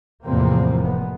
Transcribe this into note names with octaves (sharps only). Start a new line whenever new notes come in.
E2 A2 C3 F3 A#3 C4
F1 B3